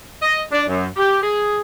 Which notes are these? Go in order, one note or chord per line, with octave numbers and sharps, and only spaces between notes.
D#5
D4
F#2
G4
G#4